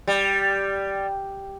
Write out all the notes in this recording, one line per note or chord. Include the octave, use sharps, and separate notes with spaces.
G3